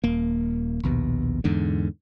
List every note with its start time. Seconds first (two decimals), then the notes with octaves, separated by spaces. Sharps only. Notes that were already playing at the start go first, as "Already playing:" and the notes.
0.04 D#1 A#3
0.83 A#1 D#2 B2
1.44 E2 G#2 D3